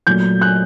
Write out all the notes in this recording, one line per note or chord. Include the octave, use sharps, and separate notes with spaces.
A#2 F#3 A3 G6
F#6